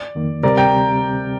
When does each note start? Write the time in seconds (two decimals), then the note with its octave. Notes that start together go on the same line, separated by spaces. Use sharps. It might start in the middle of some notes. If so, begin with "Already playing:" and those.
Already playing: D5
0.15 F2 D#3 A#3
0.43 D2 C3 G3 C4 G4 A#4 D5
0.57 G5 A#5